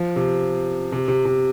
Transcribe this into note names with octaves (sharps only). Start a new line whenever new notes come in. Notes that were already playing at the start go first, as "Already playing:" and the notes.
Already playing: F3
C3
C3
C3
C3